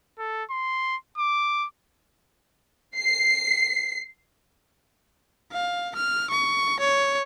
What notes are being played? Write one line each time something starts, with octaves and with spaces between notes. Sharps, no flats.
A4
C6
D6
C7
F5
F6
C#6
C#5